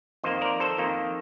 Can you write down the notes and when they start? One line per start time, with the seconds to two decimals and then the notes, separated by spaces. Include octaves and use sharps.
0.24 F2 D#3 A#3 C5 D#5
0.41 A#4 D5
0.60 A4 C5
0.78 F2 D#3 A#3